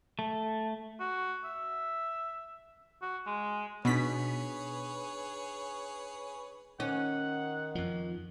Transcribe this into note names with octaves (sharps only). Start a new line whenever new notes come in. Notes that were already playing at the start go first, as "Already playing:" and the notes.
A3
F#4
E5
F#4
G#3
B2 D4 D#4 G#4 B4 C#5 B6
D#3 C#4 F#5
F2 F3